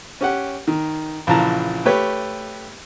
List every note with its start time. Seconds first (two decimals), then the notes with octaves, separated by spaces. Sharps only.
0.21 C#4 G4 F#5
0.68 D#3
1.27 A#1 C#3 E3 A5 A#5
1.85 A3 G4 B4 C#5